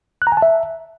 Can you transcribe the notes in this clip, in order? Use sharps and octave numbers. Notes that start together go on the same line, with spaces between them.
F#6
A#5
G#5
A5
E5